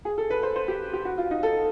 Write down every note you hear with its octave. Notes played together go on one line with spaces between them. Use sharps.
G#4
A4
B4
C5
C5
G4
G4
F#4
F4
D#4
A4